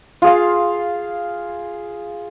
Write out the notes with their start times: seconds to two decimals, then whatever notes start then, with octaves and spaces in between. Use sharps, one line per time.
0.22 F4 G#4 F5